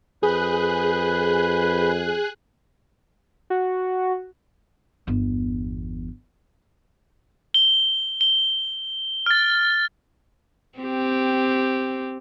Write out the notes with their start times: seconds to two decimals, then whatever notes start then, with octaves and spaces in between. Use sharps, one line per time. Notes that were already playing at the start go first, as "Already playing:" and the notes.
0.23 F2 G#4 B4 F#6 G6
3.50 F#4
5.07 G1 E2
7.54 G7
8.21 G7
9.26 F6 A6
10.78 C4 G4